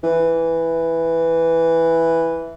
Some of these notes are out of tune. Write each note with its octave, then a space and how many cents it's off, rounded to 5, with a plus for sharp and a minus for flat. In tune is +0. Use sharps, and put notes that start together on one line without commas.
E3 +0